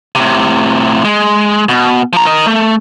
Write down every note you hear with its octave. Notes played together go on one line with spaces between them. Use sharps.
A2 C3
G#3
B2
F3 A#5
A#4 D#5
A3